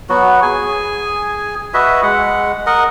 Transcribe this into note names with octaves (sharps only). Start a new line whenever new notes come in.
F#3 B3 F#4
G#4 G#5
F#4 B4 D#5 E5
G#3 F#5
A#4 D#5 F#5